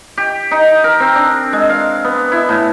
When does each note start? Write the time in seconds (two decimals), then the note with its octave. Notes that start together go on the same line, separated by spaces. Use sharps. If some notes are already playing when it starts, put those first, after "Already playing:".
0.18 G4
0.51 D#4
0.84 A#4
1.00 C4
1.16 D4
1.53 G#3
1.69 F5
2.04 B3
2.32 E4
2.49 A2